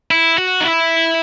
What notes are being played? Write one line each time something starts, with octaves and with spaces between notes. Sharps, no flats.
E4
F#4
D#4
E4